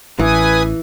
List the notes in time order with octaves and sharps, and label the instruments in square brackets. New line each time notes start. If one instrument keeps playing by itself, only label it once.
[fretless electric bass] A1 [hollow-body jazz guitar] E3 [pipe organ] B4 G#5 D#6